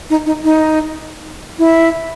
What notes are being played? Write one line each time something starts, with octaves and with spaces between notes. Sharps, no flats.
D#4
D#4
D#4
E4